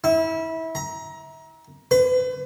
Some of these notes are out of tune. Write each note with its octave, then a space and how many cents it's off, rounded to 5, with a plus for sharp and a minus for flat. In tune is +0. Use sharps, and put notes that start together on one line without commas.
E4 -25
A#5 +25
B4 +40